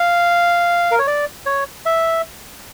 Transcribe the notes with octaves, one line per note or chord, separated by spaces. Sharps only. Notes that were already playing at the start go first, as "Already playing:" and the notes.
Already playing: F5
A#4
C#5
D5
C#5
E5